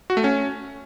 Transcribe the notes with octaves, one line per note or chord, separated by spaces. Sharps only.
F#4
A3
C#4